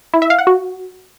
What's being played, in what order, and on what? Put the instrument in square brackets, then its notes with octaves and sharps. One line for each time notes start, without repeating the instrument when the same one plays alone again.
[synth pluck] E4
E5
F5
F#5
F#4